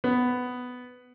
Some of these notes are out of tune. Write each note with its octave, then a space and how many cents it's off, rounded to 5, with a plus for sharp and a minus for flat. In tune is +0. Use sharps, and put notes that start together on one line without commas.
B3 +10